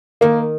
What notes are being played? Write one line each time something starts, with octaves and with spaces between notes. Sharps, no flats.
D#3 A#3